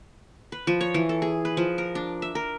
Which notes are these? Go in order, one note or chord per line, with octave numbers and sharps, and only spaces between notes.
B4
F3
C#5
E3
A4
G#4
B4
F3
A#4
D4
E5
A#4